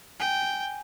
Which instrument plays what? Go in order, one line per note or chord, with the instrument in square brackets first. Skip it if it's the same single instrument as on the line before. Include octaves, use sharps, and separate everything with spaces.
[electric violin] G5 [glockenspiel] G#5